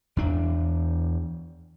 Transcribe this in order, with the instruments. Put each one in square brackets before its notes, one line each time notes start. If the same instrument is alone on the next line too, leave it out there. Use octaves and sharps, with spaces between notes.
[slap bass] E2 D4